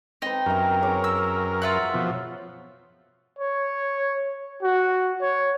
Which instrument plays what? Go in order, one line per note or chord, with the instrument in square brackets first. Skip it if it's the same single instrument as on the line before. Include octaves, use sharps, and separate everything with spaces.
[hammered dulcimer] C4 B4 [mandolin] D#4
[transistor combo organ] F#2 A#4 [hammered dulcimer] G4 E5
[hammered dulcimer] C#3 C#5 D6
[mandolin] E6
F4 E5 F#5
[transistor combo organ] B2 F3
[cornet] C#5
F#4
C#5